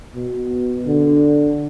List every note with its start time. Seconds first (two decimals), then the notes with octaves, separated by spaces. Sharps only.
0.15 B2
0.87 D3